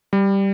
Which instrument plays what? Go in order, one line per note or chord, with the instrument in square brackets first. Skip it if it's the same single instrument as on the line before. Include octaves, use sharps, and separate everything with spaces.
[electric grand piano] G3